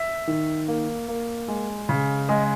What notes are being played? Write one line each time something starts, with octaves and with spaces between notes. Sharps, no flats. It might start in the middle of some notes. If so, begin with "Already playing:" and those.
Already playing: E5
D#3
A#3
A#3
G#3
C#3
G#3 D#5